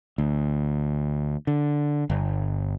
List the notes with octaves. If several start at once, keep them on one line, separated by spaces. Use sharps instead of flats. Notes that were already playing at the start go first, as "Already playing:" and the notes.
D2
D3
G1